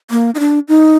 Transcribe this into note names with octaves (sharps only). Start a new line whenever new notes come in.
A#3
D#4
D4
D#4